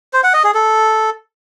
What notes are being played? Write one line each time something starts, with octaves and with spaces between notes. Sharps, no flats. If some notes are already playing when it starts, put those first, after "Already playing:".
C5
F#5
D#5
G#4
A4